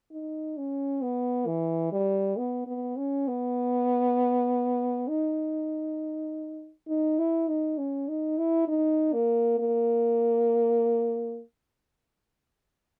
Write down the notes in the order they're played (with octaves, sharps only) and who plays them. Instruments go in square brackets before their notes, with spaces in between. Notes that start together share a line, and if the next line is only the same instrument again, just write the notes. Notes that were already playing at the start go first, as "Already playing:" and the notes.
[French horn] D#4
C#4
B3
E3
G3
B3
B3
C#4
B3
D#4
D#4
E4
D#4
C#4
D#4
E4
D#4
A#3
A#3